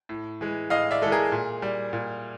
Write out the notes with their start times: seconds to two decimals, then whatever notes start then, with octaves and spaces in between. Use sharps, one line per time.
0.09 A2
0.41 E3 G#3
0.70 A2 D#5 F5
0.91 D5 E5
1.02 E3 G#3 A4
1.11 G#4 A#4
1.32 A#2
1.62 G3
1.93 A#2